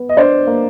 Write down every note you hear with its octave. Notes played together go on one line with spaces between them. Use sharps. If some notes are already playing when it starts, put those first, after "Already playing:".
Already playing: B3
D#5
D4 C5 D5
A#3